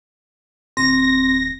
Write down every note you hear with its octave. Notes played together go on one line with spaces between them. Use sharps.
D1 C4 A#6